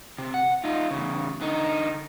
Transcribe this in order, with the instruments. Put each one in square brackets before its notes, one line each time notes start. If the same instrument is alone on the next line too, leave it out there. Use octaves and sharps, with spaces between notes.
[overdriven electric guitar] C3
F#5
D#4 F4
E2 C#3
D3 D#4